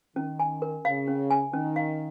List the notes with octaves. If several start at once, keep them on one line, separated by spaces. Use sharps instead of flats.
D#3 C#4
G#5
A#4
C#3 F5
C#4
G#5
D#3 C#4
F5